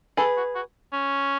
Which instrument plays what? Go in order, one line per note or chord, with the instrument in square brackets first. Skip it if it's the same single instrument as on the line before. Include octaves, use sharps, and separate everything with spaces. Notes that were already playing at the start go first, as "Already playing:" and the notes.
[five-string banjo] G#4 B4 [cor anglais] A4
[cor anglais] F#4
F#4
C#4